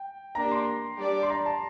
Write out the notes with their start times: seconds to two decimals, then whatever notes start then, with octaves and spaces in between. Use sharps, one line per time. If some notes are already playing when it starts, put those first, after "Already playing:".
Already playing: G5
0.35 A#3 D4 G4 A#5
0.52 C6
0.98 G3 D4 G4 D5
1.23 C6
1.30 A#5
1.46 A5